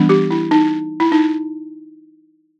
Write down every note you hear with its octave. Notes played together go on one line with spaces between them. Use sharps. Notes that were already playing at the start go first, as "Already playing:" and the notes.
Already playing: E3 G3 B3 D4
G4
E4
D#4
E4
D#4